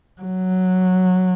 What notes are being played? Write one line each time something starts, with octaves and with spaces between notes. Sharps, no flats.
F#3